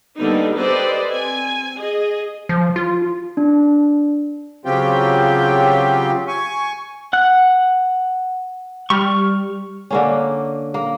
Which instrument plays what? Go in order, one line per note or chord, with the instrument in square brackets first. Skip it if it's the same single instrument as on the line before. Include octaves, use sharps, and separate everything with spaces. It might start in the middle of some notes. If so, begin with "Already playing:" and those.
[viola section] D3 G3 A#3 B3 D#4
G4 A4 B4 C5 D5 D#5
C4 G#5
G#4 D#5
[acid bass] F3
F4
[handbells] D4
[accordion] C#3 F#3 C4 F4 G4 G5
G#5 C#6
[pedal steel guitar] F#5 F#6
[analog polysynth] G3 [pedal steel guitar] C#6 F6
[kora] D3 A#3 C#4
A#3